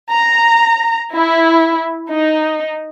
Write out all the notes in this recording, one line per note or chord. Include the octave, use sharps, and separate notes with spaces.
A#5
E4
D#4